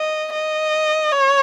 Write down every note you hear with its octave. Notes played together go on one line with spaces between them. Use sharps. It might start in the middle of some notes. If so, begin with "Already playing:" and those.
Already playing: D#5
D#5
C#5